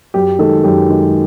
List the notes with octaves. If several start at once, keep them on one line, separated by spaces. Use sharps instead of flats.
F#2 G4
D#3 G#3 A4
F#2 G4
D#3 G#3